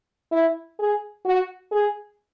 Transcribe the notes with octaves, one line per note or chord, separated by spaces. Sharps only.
E4
G#4
F#4
G#4